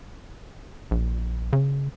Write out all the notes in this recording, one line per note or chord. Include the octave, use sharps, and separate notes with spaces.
A#1
C#3